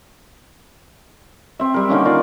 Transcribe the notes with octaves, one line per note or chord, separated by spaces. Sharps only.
C4 E5
G3 A#4
D3 D#3 A#3 C#4
F4 A#4 D5